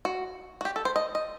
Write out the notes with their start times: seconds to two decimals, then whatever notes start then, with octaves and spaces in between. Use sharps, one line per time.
0.05 F#4
0.61 F#4
0.65 G4
0.76 A4
0.85 C5
0.96 D#5
1.15 D#5